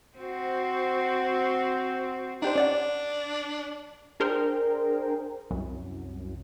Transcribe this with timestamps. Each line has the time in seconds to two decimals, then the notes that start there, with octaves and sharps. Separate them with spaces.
0.18 C4 F#4 C5
2.42 D4 D#4 G4 C5
2.56 C#4 D5 F#5
4.20 D4 G#4 A#4 C5 G5
5.51 C2 F#2